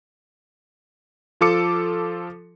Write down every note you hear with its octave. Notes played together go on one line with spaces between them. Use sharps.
F3 F4 A4 D6 C#7